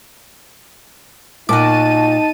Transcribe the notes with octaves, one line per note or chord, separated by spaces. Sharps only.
A#2 D#4 F#4 A5 D6 D#7